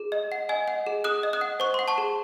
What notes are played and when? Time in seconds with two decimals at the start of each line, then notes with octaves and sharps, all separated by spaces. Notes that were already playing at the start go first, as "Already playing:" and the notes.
Already playing: G#4
0.12 D#5
0.32 F#5
0.49 D#5 G#5
0.68 F#5
0.87 G#4
1.04 G#4 D#6 F#6
1.23 D#5
1.33 D#6 F#6
1.41 F#5
1.60 C5 C#6
1.74 F#5 C6
1.88 A5 C#6
1.98 G#4